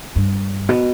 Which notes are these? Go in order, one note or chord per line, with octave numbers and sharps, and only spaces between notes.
G2
B2